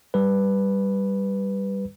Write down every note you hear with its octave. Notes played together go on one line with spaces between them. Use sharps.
G3 B4